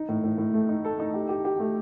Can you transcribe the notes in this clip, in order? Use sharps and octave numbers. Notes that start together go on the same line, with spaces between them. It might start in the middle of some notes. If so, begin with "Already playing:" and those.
Already playing: D#4
A2
A2
A2
A3
D#4
A4
D#4
G4
G4
G4
A3